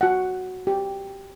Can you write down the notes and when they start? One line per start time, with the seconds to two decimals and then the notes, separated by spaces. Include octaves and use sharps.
0.01 F#4 F#5
0.67 G4